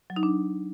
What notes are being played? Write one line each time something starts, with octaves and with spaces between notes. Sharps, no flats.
F#3
D#4
D4